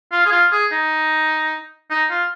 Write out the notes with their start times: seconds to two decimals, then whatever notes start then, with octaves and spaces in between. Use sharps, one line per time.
0.12 F4
0.26 G#4
0.32 F4
0.52 G#4
0.72 D#4
1.90 D#4
2.10 F4